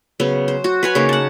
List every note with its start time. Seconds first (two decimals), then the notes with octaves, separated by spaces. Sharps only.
0.20 C#3 F#3 B3
0.48 C5
0.64 F#4
0.83 B4 C#5 G#5
0.95 C#3 A#3 D#4
1.09 F#5 A5